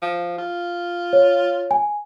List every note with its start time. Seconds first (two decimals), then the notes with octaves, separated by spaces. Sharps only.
0.02 F3
0.38 F4
1.13 C#5
1.71 G#5